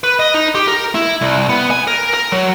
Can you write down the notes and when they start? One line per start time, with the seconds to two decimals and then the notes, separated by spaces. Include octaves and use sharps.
0.04 B4
0.19 D#5
0.34 D#4
0.55 G4
0.68 A#4
0.95 E4
1.21 C2
1.49 B3
1.71 G#5
1.87 A#4
2.14 A#4
2.32 F#3